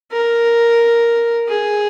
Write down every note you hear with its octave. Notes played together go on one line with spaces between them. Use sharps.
A#4
G#4